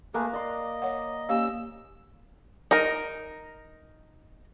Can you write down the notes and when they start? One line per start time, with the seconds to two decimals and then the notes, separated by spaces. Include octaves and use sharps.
0.14 A3 A#3 G#4 A#4 B4
0.33 D5 D#5 C6
0.82 C#5 F#5
1.29 A#3 C#4 G4 F5 E6
2.71 D#4 A#4